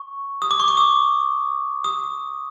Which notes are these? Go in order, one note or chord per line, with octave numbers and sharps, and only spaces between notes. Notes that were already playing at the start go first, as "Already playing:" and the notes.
Already playing: C#6
D#6
D6
C#6
D6
D#6
D#6